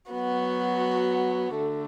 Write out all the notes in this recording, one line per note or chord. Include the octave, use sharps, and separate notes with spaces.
F#3 B3 F#4
D3 A3